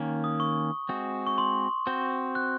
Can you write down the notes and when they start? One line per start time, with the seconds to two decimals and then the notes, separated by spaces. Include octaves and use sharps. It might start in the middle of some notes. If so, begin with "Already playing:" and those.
Already playing: D#3 A#3 C#4
0.24 D#6
0.40 C#6
0.89 G#3 C4 F#4
1.27 C#6
1.38 C6
1.87 C4 F#4 C5
2.35 F#6